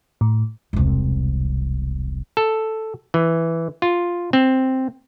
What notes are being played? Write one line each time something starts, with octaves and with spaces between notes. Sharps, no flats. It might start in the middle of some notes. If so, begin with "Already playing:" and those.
A2
E1 C2
A4
E3
F4
C4